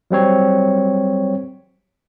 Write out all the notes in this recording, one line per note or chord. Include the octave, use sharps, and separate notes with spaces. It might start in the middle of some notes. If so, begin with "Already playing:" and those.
F#3 G3 C4 C#5